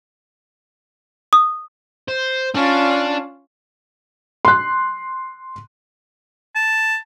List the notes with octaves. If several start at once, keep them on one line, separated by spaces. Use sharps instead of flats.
D#6
C5
C#4 D4 F4
C6 F#6
A5